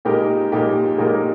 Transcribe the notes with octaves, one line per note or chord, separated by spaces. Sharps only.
A#2 G#3 D#4 G4 A#4
A#2 G#3 D#4 G4 A#4
A#2 G#3 D#4 G4 A#4